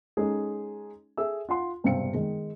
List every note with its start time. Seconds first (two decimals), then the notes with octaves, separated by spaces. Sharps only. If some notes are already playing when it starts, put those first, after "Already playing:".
0.17 G#3 C#4 D#4 G#4 A4
1.17 G#4 A4 E5 E6
1.49 F4 F#5 C6
1.84 E1 G2 C3 C4 F5 C#7
2.14 D#3 G#3 G#4